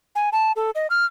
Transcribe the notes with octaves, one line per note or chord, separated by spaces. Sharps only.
G#5
A5
A4
D#5
F6